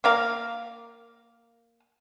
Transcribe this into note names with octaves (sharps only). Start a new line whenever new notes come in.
A#3 A#4 F5